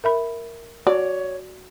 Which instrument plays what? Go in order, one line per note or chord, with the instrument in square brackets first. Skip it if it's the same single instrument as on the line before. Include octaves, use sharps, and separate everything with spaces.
[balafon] A#4 E5 B5
[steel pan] F#4 [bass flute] C#5 [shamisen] D5